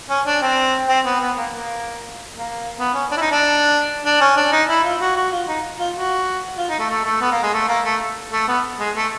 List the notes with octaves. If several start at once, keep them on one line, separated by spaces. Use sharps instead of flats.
C#4
D4
C4
C4
B3
B3
A#3
A#3
A#3
B3
C#4
D4
E4
D#4
D4
D4
C#4
D4
D#4
E4
F4
F#4
F#4
F4
D#4
F4
F#4
F4
D#4
A3
A3
A3
B3
A#3
G#3
A3
A#3
A3
A3
B3
G#3
A3